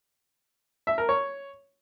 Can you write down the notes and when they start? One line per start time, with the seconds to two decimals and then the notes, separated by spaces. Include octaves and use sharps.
0.87 E5
0.98 A#4
1.09 C#5